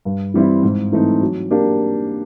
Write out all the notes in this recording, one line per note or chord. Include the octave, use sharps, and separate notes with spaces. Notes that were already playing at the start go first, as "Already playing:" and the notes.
G2
E3 G3 C4 E4
G#2
E3 A3 C4 D#4
F#3
A#3 D4 G4 A#4